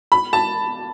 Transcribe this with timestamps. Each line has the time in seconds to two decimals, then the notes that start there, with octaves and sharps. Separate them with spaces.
0.12 B5
0.33 A5